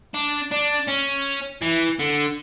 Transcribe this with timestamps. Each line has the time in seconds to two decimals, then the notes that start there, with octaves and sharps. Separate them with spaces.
0.14 D4
0.52 D4
0.88 C#4
1.62 E3
2.00 D3